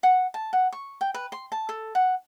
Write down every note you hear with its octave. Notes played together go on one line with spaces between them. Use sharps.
F#5
A5
F#5
C#6
G5
B4
C6
A5
A4
F#5